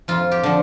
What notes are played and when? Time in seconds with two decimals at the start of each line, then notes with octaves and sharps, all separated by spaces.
0.08 F2 F4
0.31 G4
0.43 D3 F3